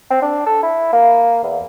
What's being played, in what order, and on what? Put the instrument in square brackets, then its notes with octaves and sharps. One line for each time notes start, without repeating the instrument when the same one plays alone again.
[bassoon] C4
D4
A4
E4
A#3
E2